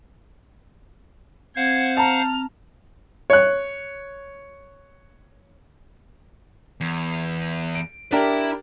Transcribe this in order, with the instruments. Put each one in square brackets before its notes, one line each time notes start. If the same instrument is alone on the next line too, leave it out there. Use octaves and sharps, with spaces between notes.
[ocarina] C4 [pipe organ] C5 F5 F#5 [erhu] G#6
[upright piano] A5 A#5 [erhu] F6
[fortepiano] C#5 F#6
[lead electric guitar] E2
[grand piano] D7
[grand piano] D4 G4 A#4 [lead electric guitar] E4 E5